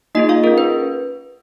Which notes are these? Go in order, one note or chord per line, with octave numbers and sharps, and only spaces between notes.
A#3 D#4 F4 G#4 D#5
F4 F5
C#4 G#4 A#4
B4